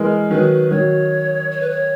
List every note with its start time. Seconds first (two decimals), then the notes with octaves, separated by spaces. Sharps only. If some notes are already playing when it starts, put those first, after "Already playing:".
Already playing: E3 G#3 A#4
0.30 D#3 F#3 B4
0.71 D#3 F#3 C#5
1.51 C#5
1.61 B4
1.70 C#5